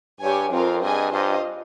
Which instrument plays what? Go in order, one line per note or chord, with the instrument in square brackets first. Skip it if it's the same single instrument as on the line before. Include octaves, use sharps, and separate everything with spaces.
[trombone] G2 [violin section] G4 C#5 G#5
[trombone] F2 [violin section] C4 F4 A#4 F5
[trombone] G2 [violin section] G#4 D#5 G#5
[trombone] G2 [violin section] F4 C5 D#5